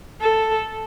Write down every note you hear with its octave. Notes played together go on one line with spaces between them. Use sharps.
A4